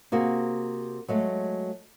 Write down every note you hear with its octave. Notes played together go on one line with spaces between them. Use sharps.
C3 A#3 F#4 G#4
F#3 G#3 A3